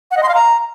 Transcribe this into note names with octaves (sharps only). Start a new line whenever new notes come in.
F#5
D#5
C6
F5
A#5